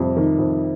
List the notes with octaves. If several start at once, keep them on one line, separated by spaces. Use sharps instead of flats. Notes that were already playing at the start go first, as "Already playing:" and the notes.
Already playing: F2 C3 G3
D#3
F2